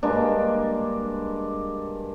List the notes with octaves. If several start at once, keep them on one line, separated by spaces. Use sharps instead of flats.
G2 G#3 A#3 D4